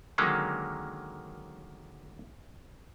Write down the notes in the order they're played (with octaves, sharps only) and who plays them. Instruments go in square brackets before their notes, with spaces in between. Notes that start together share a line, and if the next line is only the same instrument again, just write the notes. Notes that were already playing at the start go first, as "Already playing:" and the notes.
[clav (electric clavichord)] D3 D#3 F#3 G#3 A#3 C#4